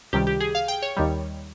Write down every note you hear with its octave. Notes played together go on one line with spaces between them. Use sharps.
C#2 C3 D#3 G3 G4
G4
G#4
F5
G5
C#5
D#2 D#3 G3